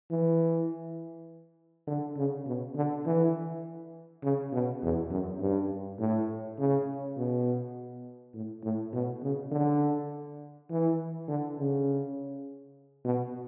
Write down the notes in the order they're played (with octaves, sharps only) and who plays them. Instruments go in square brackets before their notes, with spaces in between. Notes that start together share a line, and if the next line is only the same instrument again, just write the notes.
[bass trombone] E3
D3
C#3
B2
D3
E3
C#3
B2
E2
F#2
G2
A2
C#3
B2
A2
A2
B2
C#3
D3
E3
D3
C#3
B2